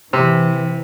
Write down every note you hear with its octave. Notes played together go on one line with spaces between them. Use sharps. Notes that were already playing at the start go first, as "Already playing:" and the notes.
C3 E3